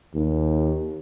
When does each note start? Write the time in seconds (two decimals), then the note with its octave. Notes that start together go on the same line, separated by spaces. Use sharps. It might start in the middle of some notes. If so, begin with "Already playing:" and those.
0.14 D#2